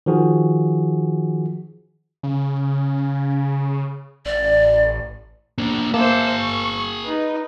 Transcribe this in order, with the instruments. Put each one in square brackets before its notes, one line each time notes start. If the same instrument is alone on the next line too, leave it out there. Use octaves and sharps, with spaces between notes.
[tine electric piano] D#3 F3 F#4 G#4
[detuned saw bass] C#3
[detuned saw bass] A1 [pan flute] D5
[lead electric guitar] A#3 D4
[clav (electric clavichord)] A#3 [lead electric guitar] G#4 A5 [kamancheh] C5 E5
[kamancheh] C#6
D#4 B4